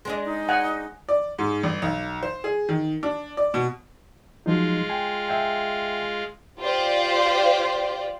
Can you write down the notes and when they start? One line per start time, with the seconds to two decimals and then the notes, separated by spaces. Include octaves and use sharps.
0.05 G#3 D4 D#5
0.25 D#4
0.49 F#5 G#5
1.09 D5
1.39 G#2
1.63 G1
1.82 B1
2.23 C5
2.44 G#4
2.69 D#3
3.03 D4
3.37 D5
3.54 B2
4.46 F3 F#3 G#3 D#4 F4
4.90 G5 G#5
5.28 E5 G5 G#5
6.59 F4 G4 C5 D5